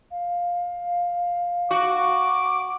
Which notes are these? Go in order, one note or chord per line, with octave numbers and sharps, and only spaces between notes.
F5
F#4 D6